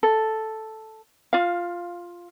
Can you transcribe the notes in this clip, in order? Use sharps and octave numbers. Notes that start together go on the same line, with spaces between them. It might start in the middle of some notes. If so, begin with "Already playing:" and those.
A4
F4 F5